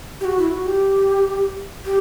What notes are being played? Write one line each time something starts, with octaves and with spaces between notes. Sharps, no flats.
G4
F#4
E4
F#4
G4
G4